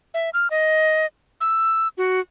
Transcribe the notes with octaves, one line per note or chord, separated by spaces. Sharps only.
E5
F6
D#5
E6
F#4